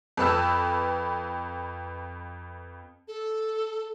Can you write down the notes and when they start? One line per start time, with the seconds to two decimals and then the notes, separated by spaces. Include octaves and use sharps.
0.17 F2 B4 A5 E6
3.08 A4